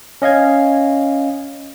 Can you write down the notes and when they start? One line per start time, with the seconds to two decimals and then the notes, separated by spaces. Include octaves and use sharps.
0.22 C#4 D#5 F5 G#6